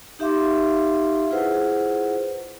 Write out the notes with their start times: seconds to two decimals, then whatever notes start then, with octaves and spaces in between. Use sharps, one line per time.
0.19 D#4 G4 E5 F5 C6 D6
1.31 E4 F4 G#4 B4 C5 F#5